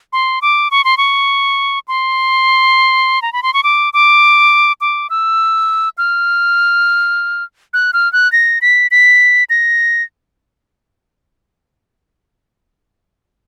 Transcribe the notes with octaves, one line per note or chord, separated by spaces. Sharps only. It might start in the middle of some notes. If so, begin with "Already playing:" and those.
C6
D6
C#6
C6
C#6
C6
A#5
B5
C6
C#6
D6
D6
D6
E6
F6
F#6
F6
F#6
A#6
B6
B6
A#6